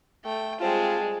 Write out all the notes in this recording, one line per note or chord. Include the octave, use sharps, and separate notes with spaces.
A3 G5
G3 G#3 C4 F4 A5